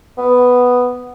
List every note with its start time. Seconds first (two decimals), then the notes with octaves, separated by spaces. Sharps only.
0.18 B3